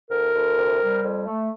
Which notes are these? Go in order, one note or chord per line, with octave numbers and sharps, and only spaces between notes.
D2 A#4
D2
C3
G3
F2
A3